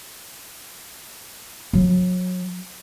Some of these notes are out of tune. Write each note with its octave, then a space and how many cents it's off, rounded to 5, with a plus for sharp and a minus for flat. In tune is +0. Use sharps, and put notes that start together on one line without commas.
F#3 -30